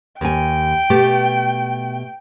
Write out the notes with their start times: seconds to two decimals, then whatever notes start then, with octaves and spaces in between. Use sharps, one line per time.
0.21 D#2 G5 G#5
0.90 B2 A3 G4